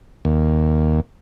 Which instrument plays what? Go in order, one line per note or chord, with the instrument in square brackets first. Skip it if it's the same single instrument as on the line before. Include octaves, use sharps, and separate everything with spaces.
[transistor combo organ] D#2